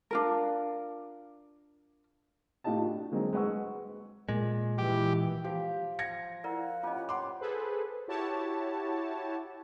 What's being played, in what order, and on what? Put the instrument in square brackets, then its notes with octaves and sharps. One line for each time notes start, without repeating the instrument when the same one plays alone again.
[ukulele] D4 F4 A#4
[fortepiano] A2 F4 G4 D#5 A5
D4 F#4
D3 F#3 G#3 A#3 C4
G#3 B4 F#5 C#6 E6
[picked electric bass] A#2 G#3
[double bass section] E3 [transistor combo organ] G4
[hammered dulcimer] F3 [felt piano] G4
[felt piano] G#6 A#6 C#7
[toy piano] E4 A#4 D5 [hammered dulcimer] F5 [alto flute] F#5
[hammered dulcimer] C#4 G4 B4 [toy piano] F4 D#5
[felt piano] C6 D6
[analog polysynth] G#4 A4 B4 C5
E4 F#4 G4 C#5 A5